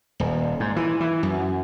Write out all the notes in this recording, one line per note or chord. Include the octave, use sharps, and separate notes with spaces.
D#1
G#2
E3
E3
F#2